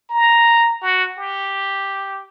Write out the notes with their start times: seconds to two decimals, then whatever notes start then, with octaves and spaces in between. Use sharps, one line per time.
0.10 A#5
0.82 F#4
1.18 G4